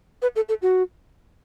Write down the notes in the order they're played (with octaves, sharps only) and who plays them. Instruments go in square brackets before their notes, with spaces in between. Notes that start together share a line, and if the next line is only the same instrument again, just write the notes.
[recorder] B4
A4
A4
F#4